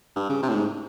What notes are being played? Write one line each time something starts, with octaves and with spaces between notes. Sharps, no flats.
G2
C#3
C3
A2
G#2